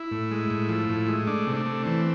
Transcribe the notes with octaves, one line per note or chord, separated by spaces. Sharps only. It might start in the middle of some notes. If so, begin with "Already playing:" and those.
Already playing: E4
A2
G#3
A2
F3
A2
G#3
A3 D4
C3
D4
A3
E3 C4